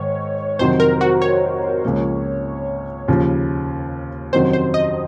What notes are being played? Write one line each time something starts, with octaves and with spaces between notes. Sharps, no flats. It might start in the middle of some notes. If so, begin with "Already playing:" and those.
Already playing: G#2 D#3 C#5
F2 C3 D#3 F#3 C5
A#4
F#4
C#5
C#2 C#3 F3 A#3
D#2 C#3 F3
F2 C3 D#3 F#3 C#4 C5
C5
D#5